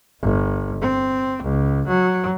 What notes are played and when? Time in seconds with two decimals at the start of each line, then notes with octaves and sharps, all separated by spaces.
0.21 G1
0.82 C4
1.43 C#2
1.88 F#3